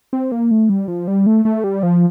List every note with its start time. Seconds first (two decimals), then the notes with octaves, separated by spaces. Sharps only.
0.13 C4
0.32 A#3
0.51 A3
0.69 G3
0.88 F3
1.08 G3
1.26 A3
1.45 A3
1.64 G3
1.83 F3